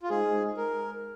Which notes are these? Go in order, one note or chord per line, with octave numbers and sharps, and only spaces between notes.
F4
G#3 D#4 G#4 C5 D#5
A#4